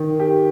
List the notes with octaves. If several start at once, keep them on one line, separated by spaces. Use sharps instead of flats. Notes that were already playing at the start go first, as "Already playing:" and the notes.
Already playing: D#3
G4